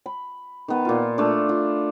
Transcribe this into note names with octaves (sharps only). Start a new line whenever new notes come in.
B5
D#3 B3
A#2 F4
A3 D4
F4